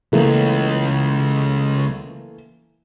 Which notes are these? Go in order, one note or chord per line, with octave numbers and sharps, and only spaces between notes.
C#2 E3 A3 A#3